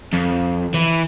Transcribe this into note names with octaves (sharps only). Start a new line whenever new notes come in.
F2
E3